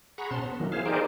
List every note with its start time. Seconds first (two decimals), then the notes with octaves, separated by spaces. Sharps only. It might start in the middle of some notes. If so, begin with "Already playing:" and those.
0.18 G#4 F#5 A#5 B5 C#6
0.31 B2 C#4 C5 A5 C6
0.44 B3
0.60 D#3 E3 F#3 A#3
0.72 E4 G#4 C5 F5
0.86 D#4 G4 G#4 A#4 C5 D5